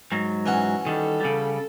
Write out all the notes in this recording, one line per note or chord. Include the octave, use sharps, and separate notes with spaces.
G#2 F#3
E3 C#4 F#4
D#3 G3 A4
C#3 G3